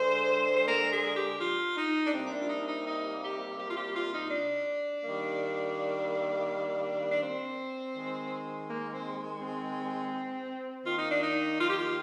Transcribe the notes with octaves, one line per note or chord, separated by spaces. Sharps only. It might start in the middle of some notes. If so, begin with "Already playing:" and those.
Already playing: D3 G#3 C5
C5
A#4
G#4
G4
F4
D#4
D4
C3 G3 A#3 C4
D#4
D4
F4
D#4
D#4
D#4
G4
G4
F4
G4
F4
D#4
D4
D#3 G3 A#3
D4
C4
D#3 G#3
A#3
C4
C4
D#3 A#3 F4
D#4
D4
D#4
F4
G4
F4